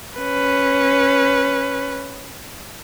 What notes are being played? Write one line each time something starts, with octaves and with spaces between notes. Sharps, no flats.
C#4 B4